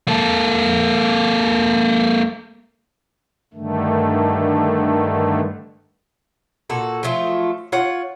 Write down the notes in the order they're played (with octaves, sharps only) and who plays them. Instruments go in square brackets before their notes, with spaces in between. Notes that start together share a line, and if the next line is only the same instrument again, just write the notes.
[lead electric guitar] A#3 A4
[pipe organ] G2 D3 D#3 A3
[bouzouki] A#2 F#4 A4
F3 F#3 A3 F4
F4 C#5 F#5